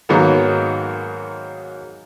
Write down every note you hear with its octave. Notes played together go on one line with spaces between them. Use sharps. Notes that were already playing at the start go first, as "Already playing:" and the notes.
G#2 D#3 F#3 G#3 A#3 B3